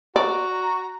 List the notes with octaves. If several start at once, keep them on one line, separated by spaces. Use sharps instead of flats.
F#4 D5 A#5